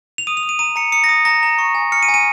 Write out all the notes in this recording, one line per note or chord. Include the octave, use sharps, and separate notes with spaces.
F7
D#6 D#7
F7
D#6
D#7
A#5 D#7
A#5 C#7
D#6 C#7
A#6
D#6
A#5 A#6
A#5
C#6
G#5
F6 C#7
D#7
G#5
D#7